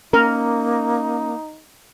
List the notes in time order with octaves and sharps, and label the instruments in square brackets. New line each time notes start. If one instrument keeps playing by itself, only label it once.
[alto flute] A#3 [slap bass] C#4 [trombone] D#4 [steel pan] A#4